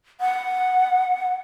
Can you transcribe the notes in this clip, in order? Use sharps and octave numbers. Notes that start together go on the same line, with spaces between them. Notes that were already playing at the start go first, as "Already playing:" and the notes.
F#5